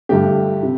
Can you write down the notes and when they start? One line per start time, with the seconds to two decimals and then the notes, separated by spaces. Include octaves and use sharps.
0.09 G2 D3 A3 G4
0.63 C3